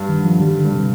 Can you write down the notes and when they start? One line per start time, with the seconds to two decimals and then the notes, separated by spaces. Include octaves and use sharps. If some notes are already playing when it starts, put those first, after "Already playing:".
Already playing: G2
0.09 D#3
0.17 D3
0.24 F3
0.40 D#3 G3
0.57 D3
0.64 G2
0.72 C3